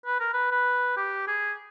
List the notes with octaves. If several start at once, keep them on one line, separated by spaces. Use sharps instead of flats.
B4
A#4
B4
B4
G4
G#4